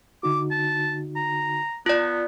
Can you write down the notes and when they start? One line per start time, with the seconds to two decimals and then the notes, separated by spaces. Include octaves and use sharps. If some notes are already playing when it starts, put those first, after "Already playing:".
0.23 D3 D#4 F#4 D6
0.51 A5
1.16 A#5
1.86 B3 F4 D5